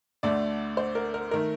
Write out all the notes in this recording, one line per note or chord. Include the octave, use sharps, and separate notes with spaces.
D2 D3 A3 D5
C5
A#4
A#4
D#3 A3 A#4